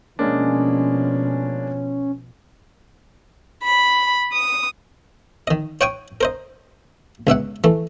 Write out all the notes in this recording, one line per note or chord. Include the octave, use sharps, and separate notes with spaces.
B2 F3 G#3 A#3 C#4 D4
B5
D#6
D#3 D#5
C#5 F#5 G5 C#6 D#6
A#4 C5 D#5
C#2 B2 E5 F#5
E3 A3